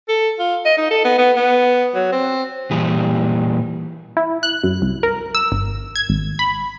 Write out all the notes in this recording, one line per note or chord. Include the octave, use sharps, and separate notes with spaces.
A4
F4
D#5
D#4
A4
B3
B3
B3
F#3
C4
A#2 E3 G3 G4 G#4
E4
F#6
F#2
C2
A#4
E6
G1
G#6
G#1
B5